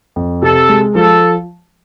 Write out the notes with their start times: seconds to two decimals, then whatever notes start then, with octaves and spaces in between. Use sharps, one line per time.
0.16 F2
0.42 C3 A4
0.69 G#3
0.95 F3 A4